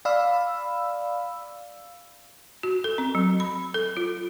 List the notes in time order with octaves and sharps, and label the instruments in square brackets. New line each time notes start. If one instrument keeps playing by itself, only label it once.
[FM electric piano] D5 F5 B5 E6
[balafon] F#4
A4
C4
F#3
B5
A4
F4